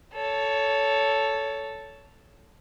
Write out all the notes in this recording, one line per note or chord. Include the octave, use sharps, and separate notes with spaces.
A4 C#5